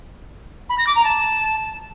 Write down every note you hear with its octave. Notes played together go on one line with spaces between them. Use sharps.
B5
A#6
D6
A#5
A5